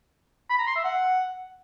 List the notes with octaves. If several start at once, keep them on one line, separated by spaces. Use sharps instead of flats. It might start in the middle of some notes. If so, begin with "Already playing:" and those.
B5
A#5
C6
E5
F#5